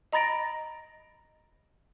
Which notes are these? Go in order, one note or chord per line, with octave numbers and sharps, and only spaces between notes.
D#5 A#5 B5 A6 A#6 D7